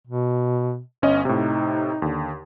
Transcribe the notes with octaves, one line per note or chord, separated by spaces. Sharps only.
B2
G1 C#4 D#5
A2 C3 D#4
D#2 D3